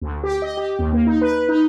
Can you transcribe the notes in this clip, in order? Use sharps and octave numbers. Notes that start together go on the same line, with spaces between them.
D2
G4
D#5
G4
D#2
A#3
D#4
B4
D#4